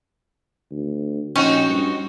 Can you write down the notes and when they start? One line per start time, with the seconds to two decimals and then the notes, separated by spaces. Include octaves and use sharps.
0.71 D2
1.36 A#1 C4 C#4 D#4 F#4
1.69 G2